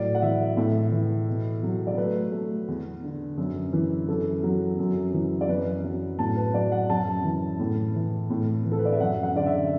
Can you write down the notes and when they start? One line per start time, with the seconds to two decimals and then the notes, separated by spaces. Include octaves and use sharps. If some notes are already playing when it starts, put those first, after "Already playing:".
Already playing: A2 F#3 D5
0.15 F#5
0.22 E3 E5
0.57 A2 E5
0.92 E3
1.28 B2
1.63 F#3
1.87 D5
1.97 A3 B4
2.32 A3
2.68 E2
3.03 D3
3.37 F#2
3.73 E3
4.08 F#2 A4
4.43 F#3
4.79 F#2
5.14 E3
5.41 D5
5.49 F#2 B4
5.84 F#3
6.19 A2 A5
6.36 B4
6.54 F#3 D5
6.72 F#5
6.90 F#2 A5
7.24 E3
7.59 A2
7.95 E3
8.30 A2
8.65 E3
8.72 A4
8.79 B4
8.85 D5
8.92 E5
9.00 F#2 F#5
9.23 F#5
9.35 D3 D5
9.46 E5